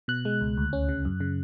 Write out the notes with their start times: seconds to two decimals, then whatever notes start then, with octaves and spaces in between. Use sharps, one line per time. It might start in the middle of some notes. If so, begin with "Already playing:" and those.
0.08 B2 F#6
0.25 G#3
0.41 C#2
0.57 D2
0.73 C#4
0.89 C#3
1.05 F#2
1.20 C#3